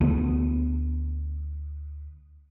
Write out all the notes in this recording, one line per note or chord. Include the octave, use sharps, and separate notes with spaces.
D2 B3